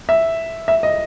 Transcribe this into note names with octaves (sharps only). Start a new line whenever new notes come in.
E5
E5
D#5